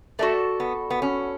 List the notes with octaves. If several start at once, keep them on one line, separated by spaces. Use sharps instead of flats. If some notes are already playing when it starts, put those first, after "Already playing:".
A3 F#4 A4 D5
B3
B3
C#4